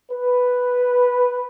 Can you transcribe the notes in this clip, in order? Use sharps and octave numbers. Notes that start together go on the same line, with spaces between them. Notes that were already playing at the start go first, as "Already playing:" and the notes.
B4